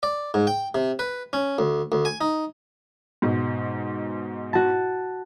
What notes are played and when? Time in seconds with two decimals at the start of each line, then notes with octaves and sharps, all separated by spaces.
0.03 D5
0.34 G#2
0.47 G5
0.75 C3
0.99 B4
1.33 C#4
1.59 D2
1.92 D2
2.05 G#5
2.21 D#4
3.22 G#2 B2
4.53 F#4 A5